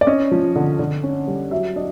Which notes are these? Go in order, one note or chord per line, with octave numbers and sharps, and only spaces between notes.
D5
C#4 D#5
F3
D3
D3
C#4
G3
F#3 E5
D4 D#5